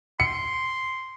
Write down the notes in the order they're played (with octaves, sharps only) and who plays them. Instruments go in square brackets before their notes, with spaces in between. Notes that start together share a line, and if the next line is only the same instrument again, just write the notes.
[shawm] C6 [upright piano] C#7